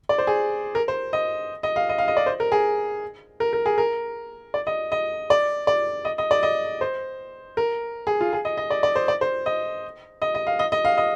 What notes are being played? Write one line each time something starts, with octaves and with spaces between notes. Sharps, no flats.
D5
C5
G#4
A#4
C5
D#5
D#5
F5
D#5
F5
D#5
D5
C5
A#4
G#4
A#4
A#4
G#4
A#4
D5
D#5
D#5
D5
D5
D#5
D#5
D5
D#5
C5
A#4
G#4
F4
G#4
D#5
D#5
D5
D5
C5
D5
C5
D#5
D#5
D#5
F5
D#5
D#5
F5
D#5